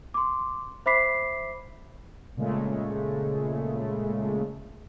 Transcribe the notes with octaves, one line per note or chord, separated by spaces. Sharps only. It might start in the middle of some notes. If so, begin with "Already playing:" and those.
C6 D6
C5 E5 B5 D6 B6 C7
A#2 C#3 G#3 A3